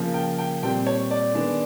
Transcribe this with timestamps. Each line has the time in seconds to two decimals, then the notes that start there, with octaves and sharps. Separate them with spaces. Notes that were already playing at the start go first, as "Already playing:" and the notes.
Already playing: C#3 F3 A#3
0.14 G5
0.38 G5
0.63 A#2 G3 C4 G5
0.87 C#5
1.11 D5
1.34 D#3 G#3 B3 D4